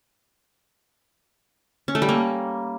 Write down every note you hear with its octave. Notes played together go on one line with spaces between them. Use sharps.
C#4
A3
G3
A#3